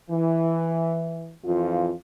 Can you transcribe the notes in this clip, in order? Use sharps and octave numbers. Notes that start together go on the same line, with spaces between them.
E3
F2 E3 F4